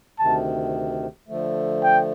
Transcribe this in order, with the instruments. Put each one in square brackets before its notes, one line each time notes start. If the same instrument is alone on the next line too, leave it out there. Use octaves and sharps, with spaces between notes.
[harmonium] D2 C3 D#3 [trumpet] A5
[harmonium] D3 F3 A3
[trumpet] G5